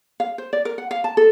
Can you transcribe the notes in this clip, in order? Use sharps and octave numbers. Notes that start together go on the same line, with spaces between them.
F5
C5
D5
A#4
F#5
F5
A5
A4